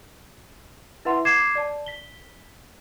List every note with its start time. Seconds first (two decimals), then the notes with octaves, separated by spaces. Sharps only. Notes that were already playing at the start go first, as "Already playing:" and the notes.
1.05 E4 B4 E5 F#5 C6
1.25 D6 G#6 C7 E7
1.55 D5 A5
1.86 B6 G7